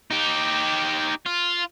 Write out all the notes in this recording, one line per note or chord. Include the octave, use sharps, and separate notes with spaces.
D#4 G4
F4